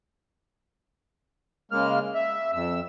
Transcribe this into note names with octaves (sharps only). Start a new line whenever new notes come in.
C#3 G#3 A#3 F6
E5
F2 E6